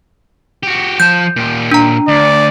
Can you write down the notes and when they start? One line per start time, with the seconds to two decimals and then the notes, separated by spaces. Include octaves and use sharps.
0.63 F#4 G4
1.00 F3 A5 G6
1.36 A#2 G4
1.72 D4 A#5
2.08 D2 D5